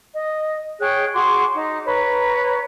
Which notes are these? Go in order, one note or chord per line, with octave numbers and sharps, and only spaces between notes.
D#5
G#4 C#5 G5 F#6
F#4 G#4 C6 D6
D#4
B4 C#5 A#5